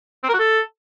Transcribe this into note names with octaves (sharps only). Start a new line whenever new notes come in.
C4
A#4
F#4
A4